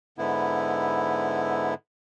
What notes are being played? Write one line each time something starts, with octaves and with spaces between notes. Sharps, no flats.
G#2 D3 B3 E4